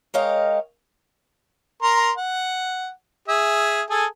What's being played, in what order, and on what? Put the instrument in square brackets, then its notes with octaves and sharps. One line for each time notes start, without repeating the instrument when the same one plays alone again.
[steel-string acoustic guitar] G#3 A#4 C#5 D#5 F5 G5
[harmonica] A#4 A#5 C6
F#5
G#4 E5
G#4 A4 G#5